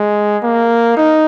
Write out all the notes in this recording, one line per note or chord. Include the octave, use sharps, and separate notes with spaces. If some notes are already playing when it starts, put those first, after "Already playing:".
Already playing: G#3
A#3
D#4